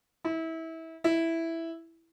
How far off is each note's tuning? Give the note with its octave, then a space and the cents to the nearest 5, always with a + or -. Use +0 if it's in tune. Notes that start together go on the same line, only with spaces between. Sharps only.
E4 -25
E4 +0